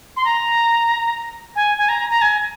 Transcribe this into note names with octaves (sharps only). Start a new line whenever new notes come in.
C6
A#5
G#5
G#5
A#5
A#5
G#5